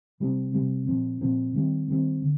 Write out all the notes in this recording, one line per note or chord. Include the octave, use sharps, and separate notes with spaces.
C3 G3 C4
C3 G3 C4
A#2 F3 C4
A#2 F3 C4
D#3 G3 C4
D#3 G3 C4
D3